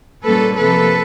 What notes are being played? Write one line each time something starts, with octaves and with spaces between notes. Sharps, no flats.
A#2 G3 A#3 C#4 A4 B4
C3 F3 A#3 A4 B4